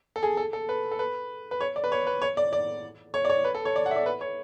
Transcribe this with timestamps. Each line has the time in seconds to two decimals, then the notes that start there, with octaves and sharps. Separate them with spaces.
0.16 A4
0.23 G#4
0.37 A4
0.53 A4
0.69 B4
0.92 A4
0.99 B4
1.51 B4
1.61 C#5
1.76 D5
1.84 B4
1.92 C#5
2.07 B4
2.22 C#5
2.37 D5
2.53 D5
3.14 C#5
3.25 D5
3.30 C#5
3.44 B4
3.55 A4
3.65 C#5
3.76 D5
3.86 F#5
3.91 E5
3.96 D5
4.06 B4
4.21 C#5